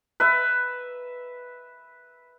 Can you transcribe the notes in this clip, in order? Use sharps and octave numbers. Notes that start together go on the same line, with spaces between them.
B4 E5